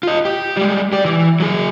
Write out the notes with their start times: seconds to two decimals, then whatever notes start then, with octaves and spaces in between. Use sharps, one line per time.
0.03 F4 D#5
0.25 G4
0.57 G3 G#3
0.93 G4 D5
1.04 E3
1.40 F#3 G#4